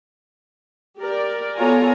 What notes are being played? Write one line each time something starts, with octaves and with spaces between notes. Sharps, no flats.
G4 A#4 D5
B3 F4 A4 C#5 G#5 A#5